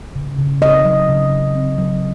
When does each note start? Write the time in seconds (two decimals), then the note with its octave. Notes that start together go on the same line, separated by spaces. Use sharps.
0.15 C#3
0.38 C#3
0.62 C4 D#5
0.85 F#3
1.09 C#3
1.32 C#3
1.55 C4
1.78 F#3